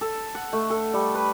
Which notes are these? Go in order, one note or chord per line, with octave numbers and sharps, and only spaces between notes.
A4
F#5
A3
A4
G3
B4